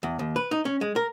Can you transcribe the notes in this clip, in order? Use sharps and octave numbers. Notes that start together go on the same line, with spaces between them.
E2
D#2
B4
D#4
C#4
G#3
A#4